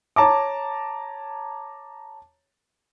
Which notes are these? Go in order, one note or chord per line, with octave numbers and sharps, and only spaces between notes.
C#5 A5 A#5 D6